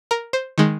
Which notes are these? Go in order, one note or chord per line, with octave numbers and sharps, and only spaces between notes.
A#4
C5
D#3 G#3